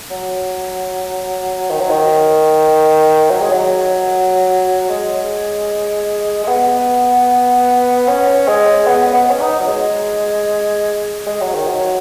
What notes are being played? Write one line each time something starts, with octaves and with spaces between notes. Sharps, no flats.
F#3
D#3
F#3
D#3
F#3
G#3
F#3
G#3
G#3
B3
C#4
G#3
B3
B3
C#4
D#4
F#3
G#3
G#3
F#3
D#3
F#3